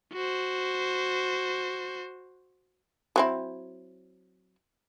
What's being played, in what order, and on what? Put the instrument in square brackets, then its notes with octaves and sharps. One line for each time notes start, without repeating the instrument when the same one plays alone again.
[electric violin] F#4 C5
[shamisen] F#3 C4 E4